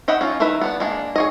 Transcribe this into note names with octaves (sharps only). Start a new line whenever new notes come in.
G4 D#5 E5 F#5 B5
C#4 D#4 F4
D#3 E4 A#4 B4 E5
B3 D4 F#5
G#3 A#3 D4
G#4 C#5 D#5